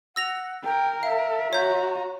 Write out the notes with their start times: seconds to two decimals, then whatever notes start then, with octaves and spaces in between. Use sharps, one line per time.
0.16 F#5 E6 A#6 F7
0.64 A#4 G5
1.03 E5 F5
1.53 F#4 C#5 A#5 G6